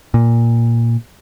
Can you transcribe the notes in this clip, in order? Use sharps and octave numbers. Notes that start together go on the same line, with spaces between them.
A#2